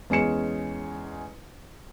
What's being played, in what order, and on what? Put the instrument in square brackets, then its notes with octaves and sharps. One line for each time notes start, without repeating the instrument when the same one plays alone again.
[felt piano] E2 G#3 C#4 G#4 C#7 E7